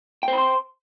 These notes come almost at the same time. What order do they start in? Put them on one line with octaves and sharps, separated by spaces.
G5 C5 B5 C6